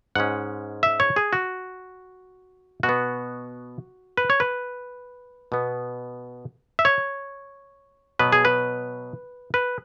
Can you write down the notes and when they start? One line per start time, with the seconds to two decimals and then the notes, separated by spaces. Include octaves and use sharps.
0.15 G#2 G#3 C#4 F#5
0.83 E5
1.00 C#5
1.16 G#4
1.33 F#4
2.83 B2 F#4
2.89 B3
4.17 B4
4.30 C#5
4.40 B4
5.52 B2 B3
6.79 E5
6.85 C#5
8.19 B2 F#3 B3 B4
8.33 G#4
8.45 B4
9.54 B4